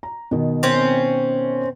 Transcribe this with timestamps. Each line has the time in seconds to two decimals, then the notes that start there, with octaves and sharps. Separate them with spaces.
0.03 A#5
0.31 B2 D#3
0.63 C4 C#4